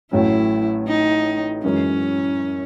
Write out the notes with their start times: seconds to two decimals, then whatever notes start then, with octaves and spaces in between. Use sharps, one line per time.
0.11 A1 A2 F#3 C#4 E4
0.88 D#4
1.64 F#2 E3 G#3 C#4